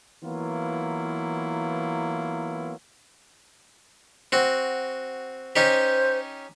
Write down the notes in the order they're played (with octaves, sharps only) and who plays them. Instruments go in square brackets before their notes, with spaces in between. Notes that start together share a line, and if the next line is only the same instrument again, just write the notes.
[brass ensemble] E3 F#3 A#3 B3 E4 F4
[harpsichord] C4 F#4
[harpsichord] C#4 D#4 G4 [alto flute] C5